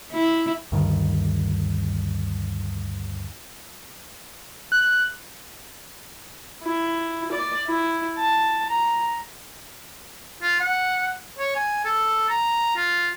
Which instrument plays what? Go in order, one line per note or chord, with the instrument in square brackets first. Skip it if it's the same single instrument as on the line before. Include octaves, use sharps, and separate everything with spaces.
[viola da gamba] E4
[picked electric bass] D2 G2 D#3
[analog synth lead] F#6
[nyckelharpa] E4
D5
E4
A5
A#5
[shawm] F4
F#5
C#5
G#5
A4
A#5
F4